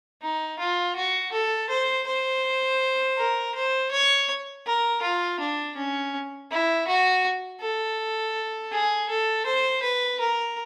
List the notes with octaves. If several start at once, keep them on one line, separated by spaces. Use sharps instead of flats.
D#4
F4
F#4
A4
C5
C5
A#4
C5
C#5
A#4
F4
D4
C#4
E4
F#4
A4
G#4
A4
C5
B4
A#4